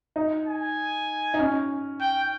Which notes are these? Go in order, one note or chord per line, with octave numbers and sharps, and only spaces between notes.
D#4
G#5
D#4
C#4
G5